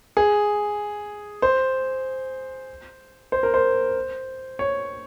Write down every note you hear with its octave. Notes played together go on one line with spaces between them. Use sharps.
G#4
C5
C5
A#4
C5
C#5